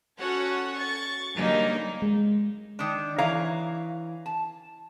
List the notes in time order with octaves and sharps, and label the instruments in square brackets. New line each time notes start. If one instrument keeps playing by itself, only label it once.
[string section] C#4 F#4 A4 C#5 F#5
C#6 A6
D3 F#3 G3 A#3 C#4 D#4
[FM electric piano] G#3
[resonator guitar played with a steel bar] D#3 D4
E3 C#5 F5 A#5
A5